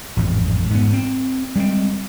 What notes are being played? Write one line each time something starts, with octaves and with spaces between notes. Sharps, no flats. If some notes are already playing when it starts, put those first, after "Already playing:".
A1 F2 G#2
G#2 B3
C4
G3 G#3 B3 C4